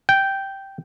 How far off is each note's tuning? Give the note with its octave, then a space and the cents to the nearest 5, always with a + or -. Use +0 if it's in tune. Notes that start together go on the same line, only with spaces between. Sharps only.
G5 -5